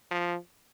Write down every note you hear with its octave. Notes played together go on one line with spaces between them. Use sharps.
F3